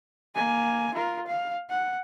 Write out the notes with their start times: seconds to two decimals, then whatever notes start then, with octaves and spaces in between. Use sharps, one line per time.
0.35 A#3 G#5
0.94 F4 A#4
1.27 F5
1.69 F#5